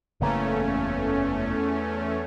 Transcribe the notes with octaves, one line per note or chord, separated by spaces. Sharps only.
F#1 E2 C#3 A3 A#3 C#4